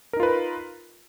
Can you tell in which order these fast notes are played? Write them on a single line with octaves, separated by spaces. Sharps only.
A#4 D#4 F4 B4